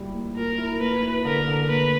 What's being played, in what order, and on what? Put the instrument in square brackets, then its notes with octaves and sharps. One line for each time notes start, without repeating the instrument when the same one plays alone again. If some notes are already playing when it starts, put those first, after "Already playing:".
Already playing: [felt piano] A#2 G3 E4
A#3
[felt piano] A#2 [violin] A#4
[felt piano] E4
[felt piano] A#3 [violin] B4
[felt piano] E4
[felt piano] D3 [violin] A#4
[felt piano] D3
[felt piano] A#3 [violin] B4